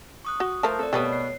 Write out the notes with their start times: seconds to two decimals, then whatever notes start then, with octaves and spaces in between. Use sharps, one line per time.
0.25 C#6 D#6 F#6
0.40 F#4
0.63 F3 A3 A#4 C5 A5
0.79 C4 A4 A#4 D5
0.93 B2 G3 A3 B4 C#5 D#6 F#6
1.12 C7